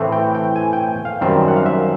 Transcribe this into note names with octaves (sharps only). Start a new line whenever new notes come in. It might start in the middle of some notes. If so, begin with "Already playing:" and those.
Already playing: A2 E3 A3 C4
G5
G5
G#5
G5
F5
F#2 D#3 G3 C4 E5
F#5
F5
E5